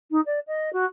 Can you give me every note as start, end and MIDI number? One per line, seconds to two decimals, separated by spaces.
0.11 0.21 63
0.26 0.39 74
0.47 0.70 75
0.73 0.85 66